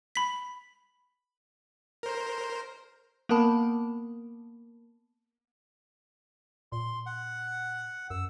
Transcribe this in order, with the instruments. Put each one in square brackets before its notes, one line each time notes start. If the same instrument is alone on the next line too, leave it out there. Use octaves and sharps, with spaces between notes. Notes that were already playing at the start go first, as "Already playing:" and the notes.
[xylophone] B5 B6
[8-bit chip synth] A#4 C5
[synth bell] A#3 B3 A#4 A5 B5
[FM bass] A#2 [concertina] C6
[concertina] F#5
[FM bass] F#2 [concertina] E6